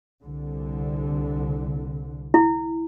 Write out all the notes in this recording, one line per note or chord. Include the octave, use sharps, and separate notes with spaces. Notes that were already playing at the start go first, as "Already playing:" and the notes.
C2 D3
E4